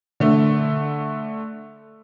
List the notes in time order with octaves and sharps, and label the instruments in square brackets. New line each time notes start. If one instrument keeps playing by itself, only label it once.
[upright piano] D3 A3